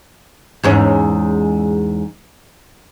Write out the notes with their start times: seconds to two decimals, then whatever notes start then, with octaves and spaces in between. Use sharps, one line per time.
0.63 E2 G#2 C#4